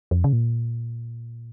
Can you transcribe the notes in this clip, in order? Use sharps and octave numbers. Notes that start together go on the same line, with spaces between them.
F2
C#3
A#2